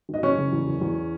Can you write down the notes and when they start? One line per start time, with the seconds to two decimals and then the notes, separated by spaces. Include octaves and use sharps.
0.09 G#1 D#5
0.23 F#1 C#4 C#5
0.38 C#3
0.53 E2
0.67 F#1
0.81 E2